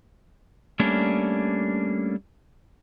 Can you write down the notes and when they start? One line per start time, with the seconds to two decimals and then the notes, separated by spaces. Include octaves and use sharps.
0.79 G3 A3 A#3 C#4 D4